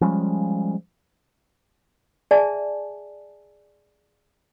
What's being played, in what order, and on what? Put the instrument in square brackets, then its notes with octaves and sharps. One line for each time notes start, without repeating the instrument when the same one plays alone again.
[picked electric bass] F3 G3 G#3 C#4
[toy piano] G#4 D5 E5 G#5 A5